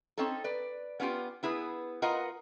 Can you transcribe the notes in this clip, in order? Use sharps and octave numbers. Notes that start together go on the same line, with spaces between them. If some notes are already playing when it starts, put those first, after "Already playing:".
C4 C#4 D#4 A4
B4 D5
B3 C#4 F4 G4
B3 E4 G#4 B4
F4 A#4 B4 D#5 F#5